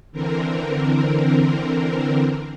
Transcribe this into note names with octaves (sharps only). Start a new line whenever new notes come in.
D3 E3 C4 A#4